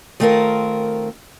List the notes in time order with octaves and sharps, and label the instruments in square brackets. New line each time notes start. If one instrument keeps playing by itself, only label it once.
[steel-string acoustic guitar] D#3 A3 C4 F4 A#4